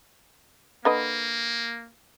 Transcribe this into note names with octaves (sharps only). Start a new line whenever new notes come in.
D3 A#3 B4 D#5